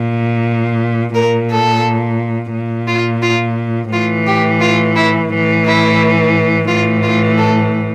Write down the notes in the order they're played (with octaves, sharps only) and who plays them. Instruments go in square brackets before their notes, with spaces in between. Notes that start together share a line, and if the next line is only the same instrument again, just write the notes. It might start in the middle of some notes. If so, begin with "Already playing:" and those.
Already playing: [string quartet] A#2
A#2 A#4
A4
A#2
F4
F4
A2 E3 F4
G4
F4
E4
A2 E3
E4
A2 E3 F4
F4
A4